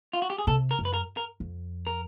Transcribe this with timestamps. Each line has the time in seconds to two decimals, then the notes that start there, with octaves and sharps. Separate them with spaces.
0.13 F4
0.22 F#4
0.30 G4
0.38 G#4
0.47 C3 A4
0.71 A#4
0.79 F#2
0.85 B4
0.94 A#4
1.17 A#4
1.40 F2
1.87 A#4